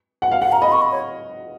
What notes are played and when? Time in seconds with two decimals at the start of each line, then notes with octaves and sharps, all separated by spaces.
0.22 F#5
0.31 F5
0.42 F5 F#5
0.52 F5 A#5
0.62 D#5 B5
0.72 C#6
0.82 B5
0.92 C#5